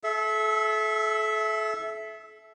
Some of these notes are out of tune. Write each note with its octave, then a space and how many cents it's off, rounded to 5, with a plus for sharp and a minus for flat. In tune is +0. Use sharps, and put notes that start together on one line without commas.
A4 -35 E5 +0